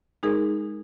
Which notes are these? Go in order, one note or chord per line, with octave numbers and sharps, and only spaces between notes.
G#3 D#4 G#4 A#4